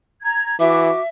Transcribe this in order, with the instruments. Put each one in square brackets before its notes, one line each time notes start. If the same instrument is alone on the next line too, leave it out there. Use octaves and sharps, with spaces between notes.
[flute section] A#5 G#6
[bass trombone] E3 [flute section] F#4 D6 [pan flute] E5